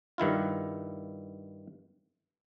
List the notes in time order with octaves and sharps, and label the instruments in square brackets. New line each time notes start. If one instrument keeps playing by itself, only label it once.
[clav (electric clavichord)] G2 D#3 E4 F4